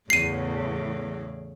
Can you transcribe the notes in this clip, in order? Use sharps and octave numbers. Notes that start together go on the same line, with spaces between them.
E2 A2 C#3 C7 D#7